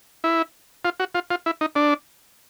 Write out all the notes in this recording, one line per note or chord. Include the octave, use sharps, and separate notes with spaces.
E4
F4
F#4
F4
F4
E4
D#4
D4